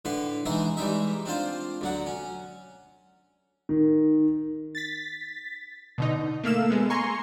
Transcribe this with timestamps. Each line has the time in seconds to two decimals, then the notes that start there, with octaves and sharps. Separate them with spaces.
0.05 A2 D3 B4 C6
0.46 E3 G#3 D#4 E4 A#5 C6
0.77 E3 G3 G#3 D#4 E5
1.25 C4 D4 F4 C5
1.81 D2 F#3 F#5
2.06 C#4
3.69 D#3
4.75 A6 B6
5.98 B2 D3 D#4
6.44 A3 A#3 F5 E6 E7
6.70 G#3 B3
6.90 G#5 A#5 C6 C#6